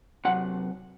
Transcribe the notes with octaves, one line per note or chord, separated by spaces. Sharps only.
C3 F#3 F#5